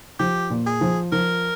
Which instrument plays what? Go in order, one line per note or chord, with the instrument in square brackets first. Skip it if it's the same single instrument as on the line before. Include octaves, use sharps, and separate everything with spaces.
[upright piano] F3 [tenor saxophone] G4
[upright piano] A#2
[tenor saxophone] G#4
[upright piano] F3
[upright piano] F3 [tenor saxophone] A#4